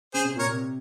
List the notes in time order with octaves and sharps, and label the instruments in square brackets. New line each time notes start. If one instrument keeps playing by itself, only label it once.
[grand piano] C#3 [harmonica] G#4 C5
[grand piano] C3
[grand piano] A#2 [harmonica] A#4 C#5
[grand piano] C3